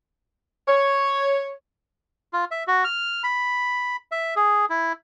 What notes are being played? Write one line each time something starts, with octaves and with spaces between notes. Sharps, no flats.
C#5
F4
E5
F#4
F6
B5
E5
G#4
E4